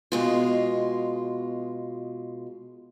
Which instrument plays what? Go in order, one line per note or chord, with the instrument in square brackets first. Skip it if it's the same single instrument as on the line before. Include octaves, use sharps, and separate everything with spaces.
[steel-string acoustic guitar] B2 G#3 F4